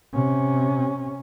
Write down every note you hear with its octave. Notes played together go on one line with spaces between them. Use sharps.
C3 C#4